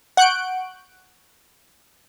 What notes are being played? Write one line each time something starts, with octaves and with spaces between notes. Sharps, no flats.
F#5 C#6 F#6 G6 D7